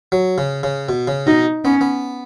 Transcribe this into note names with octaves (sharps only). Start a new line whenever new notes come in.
F#3
C#3
C#3
B2
C#3
B2 D#4
B3 C#4
B3